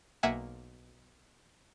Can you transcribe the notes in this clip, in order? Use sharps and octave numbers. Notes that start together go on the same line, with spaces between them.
B1 A#3 E5 F#5 G#5